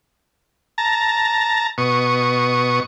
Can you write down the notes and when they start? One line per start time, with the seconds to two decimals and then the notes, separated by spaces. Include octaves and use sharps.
0.78 A5 A#5
1.78 B2 C#6 D#6